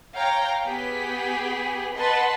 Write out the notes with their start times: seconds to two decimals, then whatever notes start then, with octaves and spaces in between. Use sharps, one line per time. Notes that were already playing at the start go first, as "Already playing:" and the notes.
0.16 C#5 F5 G5 A#5
0.64 B3 G4 G#4 B6
1.96 B4 D#5 F#5 A5 B5 C6